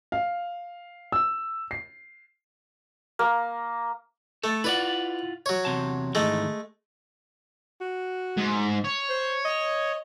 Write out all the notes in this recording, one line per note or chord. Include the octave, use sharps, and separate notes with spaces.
F5
E6
C7
A#3
A3 A4
E4 F4 B4 D5 F#5
F#3 C#5
E2 C3 A5
G#2 D#3 E3 G#3 A3
F#4
G#2
C#5
C5
D#5